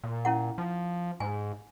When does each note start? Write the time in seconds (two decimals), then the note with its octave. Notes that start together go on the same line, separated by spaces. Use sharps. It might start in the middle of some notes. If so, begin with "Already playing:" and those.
0.04 A#2
0.25 C#4 E4 F#5
0.58 F3
1.20 G#2 G#5